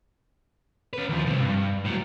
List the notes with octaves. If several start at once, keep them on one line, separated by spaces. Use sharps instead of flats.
C#4 B4
D#2 F3
C2 C3
G2
A2 F#3